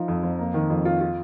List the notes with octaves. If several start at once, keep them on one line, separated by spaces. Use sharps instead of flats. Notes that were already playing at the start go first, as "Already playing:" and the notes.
Already playing: F3 D#4
F2
F2
A#3
D#3
F2
F4
F4